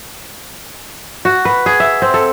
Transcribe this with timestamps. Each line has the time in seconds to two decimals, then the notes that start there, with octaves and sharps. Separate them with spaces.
1.25 F#4
1.45 B4
1.66 G#4
1.80 E5
2.02 C4
2.14 A4